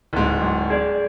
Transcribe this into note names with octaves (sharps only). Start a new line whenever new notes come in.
D1 G#2
F#2
G#4 D5